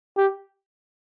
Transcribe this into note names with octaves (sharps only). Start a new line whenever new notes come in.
G4